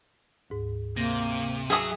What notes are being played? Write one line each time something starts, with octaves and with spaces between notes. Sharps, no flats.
D2 G#2
C3 A#3 A#6
F#3 G#4 E5 G#5 D#6